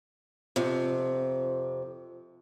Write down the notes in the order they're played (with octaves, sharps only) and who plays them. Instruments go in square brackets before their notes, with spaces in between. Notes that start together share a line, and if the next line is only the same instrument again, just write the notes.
[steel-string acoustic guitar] F2 C3